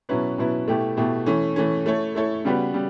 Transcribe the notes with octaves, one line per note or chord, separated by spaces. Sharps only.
B2 F#3 C#4 E4 B4
B2 F#3 C#4 E4 B4
B2 A3 E4 G4
B2 A3 E4 G4
E3 A3 C#4
E3 A3 C#4
A3 E4 A4 C#5
A3 E4 A4 C#5
C#3 G3 B3 F#4 B4
C#3 G3